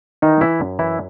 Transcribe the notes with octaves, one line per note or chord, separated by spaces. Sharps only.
D#3 E3 D#4
E3 E4
F#2
E3 E4